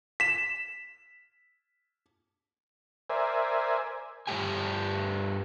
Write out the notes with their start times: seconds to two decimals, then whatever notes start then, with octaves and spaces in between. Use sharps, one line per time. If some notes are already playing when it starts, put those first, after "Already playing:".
0.20 B6 E7
3.10 A#4 C5 D5 E5 G#5
4.27 G2 G3 A3 G4 G#5